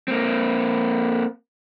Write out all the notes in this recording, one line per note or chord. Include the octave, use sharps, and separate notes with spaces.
A#3 C4